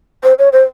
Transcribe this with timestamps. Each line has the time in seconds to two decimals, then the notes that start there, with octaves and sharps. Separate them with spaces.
0.23 C5
0.39 C#5
0.53 C5